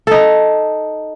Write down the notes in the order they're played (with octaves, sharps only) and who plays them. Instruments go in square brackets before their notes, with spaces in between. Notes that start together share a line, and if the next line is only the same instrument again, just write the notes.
[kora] D#4 A4